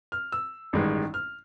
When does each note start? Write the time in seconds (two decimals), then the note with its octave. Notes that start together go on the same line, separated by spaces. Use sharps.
0.12 F6
0.32 E6
0.73 A1 G2 D#3 G#3
1.14 F6